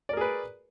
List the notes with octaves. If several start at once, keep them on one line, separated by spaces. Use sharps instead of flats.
G#4 A#4 B4 D5